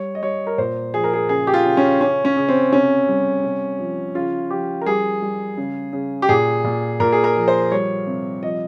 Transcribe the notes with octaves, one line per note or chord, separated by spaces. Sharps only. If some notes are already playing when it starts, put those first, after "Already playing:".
Already playing: G3 C#5
D#5
G3 C#5
A#4
A#2 C5
F3 G#4
A#4
G#4
C#3 G#4
G4
F4
C#3
C#4
C#3 C#4
C#4
C#3
C4
C3 C#4
G3
C3
F3
C#3 F4
F3 G4
A#4
G3 G#4
G3
C#3
C#3
G4
A#2 G#4
A#2
A#2 A#4
G#4
A#4
F3
C5
G3 C#5
C3
F3 D#5